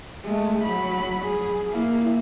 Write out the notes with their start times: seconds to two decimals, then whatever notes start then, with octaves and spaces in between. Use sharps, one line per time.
0.24 G#3 A3
0.63 F#3 B5
1.25 G#4
1.70 A#3 E4